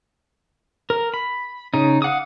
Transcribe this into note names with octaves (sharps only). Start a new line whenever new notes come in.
A#4
B5
C#3 D#4
F5 F#5 D6 D#6